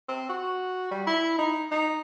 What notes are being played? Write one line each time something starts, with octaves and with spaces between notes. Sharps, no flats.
C4
F#4
G3
E4
D#4
D#4